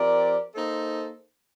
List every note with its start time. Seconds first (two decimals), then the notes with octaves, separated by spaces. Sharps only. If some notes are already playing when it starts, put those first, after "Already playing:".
Already playing: F3 C4 G4 A#4 D5
0.53 A#3 D#4 A4 C5